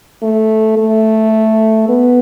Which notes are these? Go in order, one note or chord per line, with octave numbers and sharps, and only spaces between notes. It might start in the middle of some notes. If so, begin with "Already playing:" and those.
A3
A3
B3